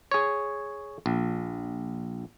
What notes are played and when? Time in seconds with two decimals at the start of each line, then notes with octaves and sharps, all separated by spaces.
0.11 G#4 C#5
1.06 A#1